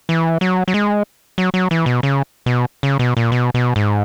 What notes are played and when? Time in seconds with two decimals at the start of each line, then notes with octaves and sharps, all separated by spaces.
0.09 E3
0.41 F#3
0.68 F#3
0.74 G#3
1.38 F#3
1.54 F#3
1.71 E3
1.86 B2
2.03 C#3
2.46 B2
2.83 C#3
2.99 B2
3.17 A#2
3.32 B2
3.54 B2
3.76 G#2